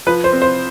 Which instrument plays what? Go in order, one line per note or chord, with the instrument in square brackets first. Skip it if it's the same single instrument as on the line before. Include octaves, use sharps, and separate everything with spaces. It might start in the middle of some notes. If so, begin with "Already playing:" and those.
[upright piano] F3 B4
C5
C4
C5